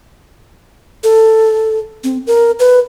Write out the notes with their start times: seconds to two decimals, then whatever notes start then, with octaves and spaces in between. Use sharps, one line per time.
1.03 A4
2.04 C4
2.27 A#4
2.59 B4